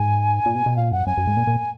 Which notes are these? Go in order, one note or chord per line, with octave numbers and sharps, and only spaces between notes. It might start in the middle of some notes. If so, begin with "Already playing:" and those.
Already playing: G#2 G#5
A#2
B2
B2
A#2 F5
F#2 F#5
F#2 G#5
F#2
G#2
A#2
A#2